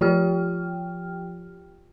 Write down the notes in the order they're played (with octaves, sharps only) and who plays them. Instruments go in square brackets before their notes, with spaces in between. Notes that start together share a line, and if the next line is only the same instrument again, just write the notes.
[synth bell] F3 F4 G4 G5 F6